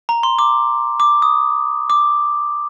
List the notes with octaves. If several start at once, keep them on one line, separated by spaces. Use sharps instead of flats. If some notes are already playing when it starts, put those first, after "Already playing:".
A#5
C6
D6
D6
D#6
D6